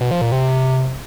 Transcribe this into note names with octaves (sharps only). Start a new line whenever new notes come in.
B2
F3
A#2
C3